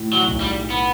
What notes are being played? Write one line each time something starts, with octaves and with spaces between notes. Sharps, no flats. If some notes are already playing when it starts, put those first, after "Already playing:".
Already playing: A2
F#3
B1
G3
B3